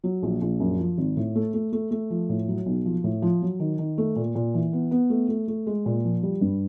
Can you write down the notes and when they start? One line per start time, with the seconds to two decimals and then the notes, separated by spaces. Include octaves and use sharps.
0.04 F#3
0.23 A#1
0.42 A#1
0.60 F#2
0.79 F3
0.98 G#1
1.17 A2
1.35 A3
1.54 A3
1.72 A3
1.91 A3
2.10 F3
2.29 A2
2.48 F#3
2.66 B1
2.85 F3
3.04 A2
3.22 F3
3.42 F#3
3.60 D#3
3.79 D#3
3.98 A3
4.16 A#2
4.35 A#2
4.54 E3
4.73 B3
4.91 B3
5.10 A3
5.29 A3
5.48 A3
5.67 G#3
5.86 A#2
6.05 F3
6.23 G3
6.41 G2